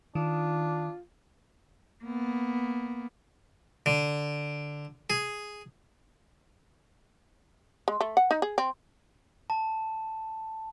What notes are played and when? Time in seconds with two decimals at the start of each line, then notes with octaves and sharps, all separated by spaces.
0.15 D#3 D4 F4
2.04 A#3 B3
3.86 D3
5.10 G#4
7.88 G#3
8.01 A3
8.17 F#5
8.31 D#4
8.42 G#4
8.58 C4
9.50 A5